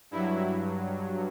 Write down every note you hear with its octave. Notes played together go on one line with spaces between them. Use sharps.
G2 F#3 E4